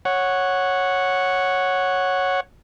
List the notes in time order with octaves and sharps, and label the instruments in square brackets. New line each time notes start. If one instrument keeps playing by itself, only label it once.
[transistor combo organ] C#5 F#5